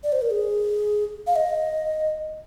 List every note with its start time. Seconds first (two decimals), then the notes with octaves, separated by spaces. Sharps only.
0.04 D5
0.12 C5
0.22 A#4
0.31 G#4
1.27 F5
1.36 D#5